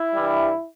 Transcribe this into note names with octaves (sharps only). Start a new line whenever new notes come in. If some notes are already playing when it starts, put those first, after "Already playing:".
Already playing: E4
G2 E3 G3